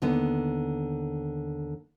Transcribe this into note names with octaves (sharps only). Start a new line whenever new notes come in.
D#2 D3 B3